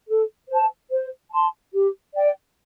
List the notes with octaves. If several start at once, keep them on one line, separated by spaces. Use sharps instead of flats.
A4
C5 A5
C5
A5 C6
G4
D5 G5